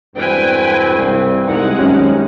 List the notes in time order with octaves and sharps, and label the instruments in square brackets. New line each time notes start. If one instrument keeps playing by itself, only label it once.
[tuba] E1 [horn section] G2 C4 [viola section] B4 G5 G#5
[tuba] C2
[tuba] C2 [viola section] G#3 F#5 [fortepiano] D#4
[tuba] G#1 [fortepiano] F#2 G3 C#4